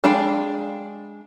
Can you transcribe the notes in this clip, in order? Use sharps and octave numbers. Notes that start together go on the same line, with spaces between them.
G#3 D4 F5 G5 B5